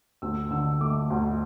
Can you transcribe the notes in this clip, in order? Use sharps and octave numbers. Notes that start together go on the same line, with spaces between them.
D2 E6
D3 E6
A3 D6
D2